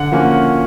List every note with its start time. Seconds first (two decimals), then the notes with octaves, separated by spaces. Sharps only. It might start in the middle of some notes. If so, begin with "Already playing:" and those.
Already playing: D3 F#5
0.12 F3 A#3 C#4 F#4